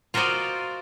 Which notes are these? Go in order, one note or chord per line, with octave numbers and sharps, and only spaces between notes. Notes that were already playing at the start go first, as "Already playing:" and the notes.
F4 F#4 A#4 C5 D5 D#5